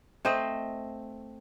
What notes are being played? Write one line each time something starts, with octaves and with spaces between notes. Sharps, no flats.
A3 C4 C5 D#5